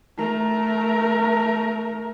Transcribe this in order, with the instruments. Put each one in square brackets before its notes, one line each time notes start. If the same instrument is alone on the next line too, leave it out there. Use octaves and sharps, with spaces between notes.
[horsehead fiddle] A3 A#4